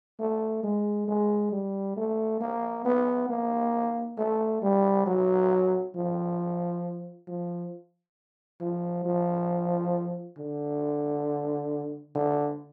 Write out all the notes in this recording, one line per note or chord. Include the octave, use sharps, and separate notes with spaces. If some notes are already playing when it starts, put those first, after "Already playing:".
A3
G#3
G#3
G3
A3
A#3
B3
A#3
A3
G3
F#3
F3
F3
F3
F3
D3
D3